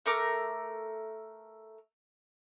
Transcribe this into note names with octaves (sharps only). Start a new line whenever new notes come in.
A3 A#4 D6